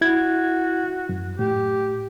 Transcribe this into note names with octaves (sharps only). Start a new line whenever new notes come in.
E4 F#4 G#6
F#2
A2 G4